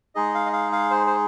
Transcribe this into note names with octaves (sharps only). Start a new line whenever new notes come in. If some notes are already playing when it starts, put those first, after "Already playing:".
G#3 D#4 G#4 D#5
F5
D#5
F5
F5
C5
C5